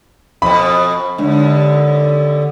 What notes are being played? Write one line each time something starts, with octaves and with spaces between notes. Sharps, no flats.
F2 B2 B5
D#2 D3 G#3 D4 D5